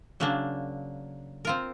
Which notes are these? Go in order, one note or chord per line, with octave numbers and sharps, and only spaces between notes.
C#3 F#3 A#3 D4
C4 F4 A#4